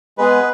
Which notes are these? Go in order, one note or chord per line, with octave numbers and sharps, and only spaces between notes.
G#3 B3 G#4 B4